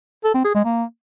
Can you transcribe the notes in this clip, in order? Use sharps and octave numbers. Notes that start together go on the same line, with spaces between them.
A4
C4
G#4
G#3
A#3